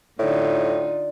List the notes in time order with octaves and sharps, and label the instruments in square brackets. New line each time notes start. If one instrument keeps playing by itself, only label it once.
[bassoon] A2 [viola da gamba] D3 D#4 F4 [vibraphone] D5